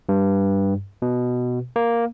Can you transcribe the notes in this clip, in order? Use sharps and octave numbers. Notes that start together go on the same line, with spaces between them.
G2
B2
A#3